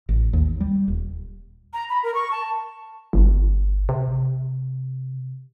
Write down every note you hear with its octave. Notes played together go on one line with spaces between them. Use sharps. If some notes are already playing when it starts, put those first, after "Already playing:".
A1
D#2
G3
D#1
A#5
B5
A#4
C#6
A5
G1
C3